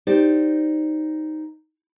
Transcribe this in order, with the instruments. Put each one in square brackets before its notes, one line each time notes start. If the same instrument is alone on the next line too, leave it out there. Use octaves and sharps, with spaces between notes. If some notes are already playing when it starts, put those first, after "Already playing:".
[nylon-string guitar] D#4 G4 C5 D5